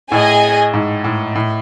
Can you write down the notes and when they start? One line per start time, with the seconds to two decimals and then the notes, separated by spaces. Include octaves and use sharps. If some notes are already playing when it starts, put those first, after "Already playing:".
0.11 A2 G#4 D#5 G#5
0.74 G#2
1.04 A2
1.35 A2